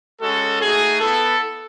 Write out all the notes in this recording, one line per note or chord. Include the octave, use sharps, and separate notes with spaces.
G#3 C#4 F#4 A4
A3 D#4 F#4 G#4
B3 E4 A4